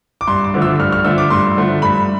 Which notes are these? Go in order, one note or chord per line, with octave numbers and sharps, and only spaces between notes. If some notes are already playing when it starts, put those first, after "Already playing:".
D6
G2 C6
D6
D3 F3 A3
E6
G2 F6
F6
D3 F3 A3 E6
D6
G2 C6
D3 F3 A3
G2 B5